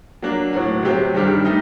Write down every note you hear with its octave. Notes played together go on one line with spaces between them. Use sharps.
F#3 A#3 D4
A2 F#3 C4 F#4
C3 F#3 C4 G4
G2 D#3 G3 D4 G4
A3 D#4